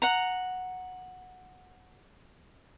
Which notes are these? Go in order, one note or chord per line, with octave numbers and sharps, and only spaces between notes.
F#5 A#5